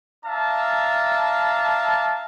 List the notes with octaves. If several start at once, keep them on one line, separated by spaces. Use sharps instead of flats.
D4 E5 F5 A5 A#5